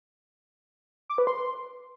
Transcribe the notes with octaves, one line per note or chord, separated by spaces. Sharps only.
D6
B4
C6